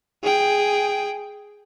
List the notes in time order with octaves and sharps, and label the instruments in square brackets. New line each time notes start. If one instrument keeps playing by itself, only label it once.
[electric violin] G#4 G5